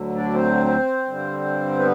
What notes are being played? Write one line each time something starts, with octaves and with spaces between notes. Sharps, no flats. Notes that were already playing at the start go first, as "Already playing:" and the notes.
Already playing: D2 D3 F#3
D4 D5
C4 C5
G2 D3 G3
B3 B4